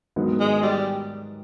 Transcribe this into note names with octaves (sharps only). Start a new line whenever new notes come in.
G#2 D#3 F#3 B3
G#3
G3